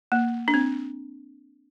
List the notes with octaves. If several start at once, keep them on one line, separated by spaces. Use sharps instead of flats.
A#3
D4
C4